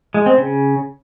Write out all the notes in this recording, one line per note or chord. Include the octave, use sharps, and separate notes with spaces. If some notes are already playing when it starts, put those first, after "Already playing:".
G#3
C4
C#3